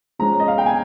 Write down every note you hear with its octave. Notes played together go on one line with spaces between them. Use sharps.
F3 G#3 C#4 A#5
D#5
F5
G5
G#5